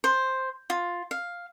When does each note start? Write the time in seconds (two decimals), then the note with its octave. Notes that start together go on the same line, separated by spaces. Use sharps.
0.04 C5
0.70 F4
1.11 F5